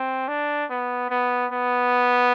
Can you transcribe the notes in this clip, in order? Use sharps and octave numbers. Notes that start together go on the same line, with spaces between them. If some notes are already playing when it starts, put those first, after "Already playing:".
Already playing: C4
D4
B3
B3
B3